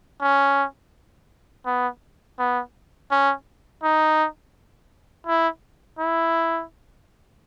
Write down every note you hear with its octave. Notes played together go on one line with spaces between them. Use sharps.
C#4
B3
B3
C#4
D#4
E4
E4